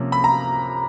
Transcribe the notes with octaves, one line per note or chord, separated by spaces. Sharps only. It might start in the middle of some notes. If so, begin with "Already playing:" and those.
Already playing: C3 F3 A#3 C#4
B5
A#5